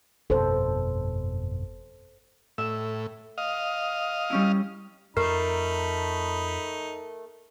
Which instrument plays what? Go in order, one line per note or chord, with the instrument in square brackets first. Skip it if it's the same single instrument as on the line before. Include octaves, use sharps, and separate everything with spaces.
[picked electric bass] G1 F2 B2 [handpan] A4 C5
[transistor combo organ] A2 [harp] E5
[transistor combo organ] D#5 F5
[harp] G3 C#4 E4
[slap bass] F2 [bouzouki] A3 [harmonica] D#4 B5 [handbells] A#4